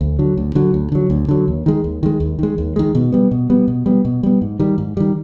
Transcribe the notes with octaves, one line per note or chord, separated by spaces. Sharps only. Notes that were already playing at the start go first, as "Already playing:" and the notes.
D2
D3 F#3
D2
D3 F#3
D2
D3 F#3
D2
D3 F#3
D#2
D#3 G#3
D#2
D#3 G#3
D#2
D#3 G#3
D#2
D#3 G#3
B2
G3 B3
B2
G3 B3
B2
G3 B3
B2
G3 B3
G#2
D#3 G3
G#2
D#3 G3